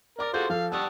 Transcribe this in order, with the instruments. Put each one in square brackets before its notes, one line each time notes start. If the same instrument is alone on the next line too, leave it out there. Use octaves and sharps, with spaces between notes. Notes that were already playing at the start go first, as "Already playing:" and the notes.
[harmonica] A#4 [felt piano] D5 D6 A6
[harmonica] F4 F#4 C5 [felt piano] G#4 A4 G6
[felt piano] F3 A4 [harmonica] F5
[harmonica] G3 F#5 A5 [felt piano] C#6 D#6 E6